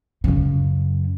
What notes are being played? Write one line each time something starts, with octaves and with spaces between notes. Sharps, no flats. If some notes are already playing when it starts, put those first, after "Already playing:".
F#2 C#3